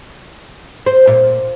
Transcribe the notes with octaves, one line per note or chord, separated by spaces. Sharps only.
C5
A#2